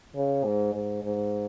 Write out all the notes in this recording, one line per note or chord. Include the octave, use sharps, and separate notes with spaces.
C#3
G#2
G#2
G#2